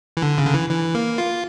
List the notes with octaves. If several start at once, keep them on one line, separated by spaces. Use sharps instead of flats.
E3
D3
C#3
D3
E3
E3
A#3
F4